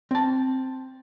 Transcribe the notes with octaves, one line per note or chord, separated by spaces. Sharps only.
C4 A5